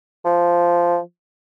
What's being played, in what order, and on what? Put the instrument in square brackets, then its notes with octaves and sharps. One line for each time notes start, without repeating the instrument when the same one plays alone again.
[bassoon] F3